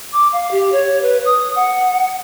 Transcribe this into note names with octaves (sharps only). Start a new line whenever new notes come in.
D6
F5
G4
C#5
B4
D#6
F#5